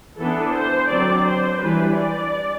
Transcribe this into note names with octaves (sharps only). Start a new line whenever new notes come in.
E3 B3 D4 A4
C5
D3 F#3 C4 D5
C5
E3 G3 D4 B4
D5